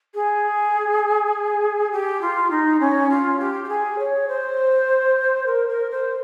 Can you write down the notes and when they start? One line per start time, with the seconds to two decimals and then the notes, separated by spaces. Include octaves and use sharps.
0.15 G#4
1.92 G4
2.21 F4
2.51 D#4
2.80 C#4
3.10 F4
3.40 G4
3.64 G4
3.69 G#4
3.99 C#5
4.28 C5
5.46 A#4
5.69 A#4
5.91 C5